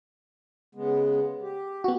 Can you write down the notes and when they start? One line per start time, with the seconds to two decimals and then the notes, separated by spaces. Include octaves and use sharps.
0.75 C#3 G#3 B3
1.42 G4
1.84 B3 F#4